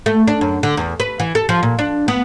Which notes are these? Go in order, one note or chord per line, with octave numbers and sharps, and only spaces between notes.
A3
D4
F#2
D3
E2
B4
E3
A4
F3
A#2
D4
B3